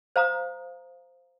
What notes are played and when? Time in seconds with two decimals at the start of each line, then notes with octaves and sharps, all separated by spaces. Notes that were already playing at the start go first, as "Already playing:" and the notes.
0.16 C5 F5 A#5 D#6